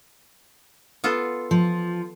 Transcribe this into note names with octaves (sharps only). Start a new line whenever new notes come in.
B3 F4 A4
F3